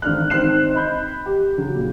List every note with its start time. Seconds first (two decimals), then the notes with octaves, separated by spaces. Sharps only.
0.02 G#1 D3 D4 F6 F#6
0.30 D#3 C4 F#6 C7 E7
0.74 D#5 B5 G6
1.26 G4
1.58 C#3 F#3
1.76 A#2